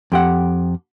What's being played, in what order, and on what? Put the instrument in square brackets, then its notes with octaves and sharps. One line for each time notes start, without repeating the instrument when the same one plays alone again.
[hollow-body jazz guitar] F2 G4 F#5